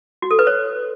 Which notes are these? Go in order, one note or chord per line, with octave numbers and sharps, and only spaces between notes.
F#4
A4
B4
C#5